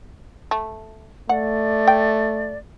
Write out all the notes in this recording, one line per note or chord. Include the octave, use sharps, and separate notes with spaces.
A3
A3 D5 F#5
G5